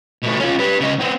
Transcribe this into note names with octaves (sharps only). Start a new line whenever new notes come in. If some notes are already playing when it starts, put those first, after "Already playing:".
B2 A3
C#4 F4
G3 B4
C#3 D#5
B3 C4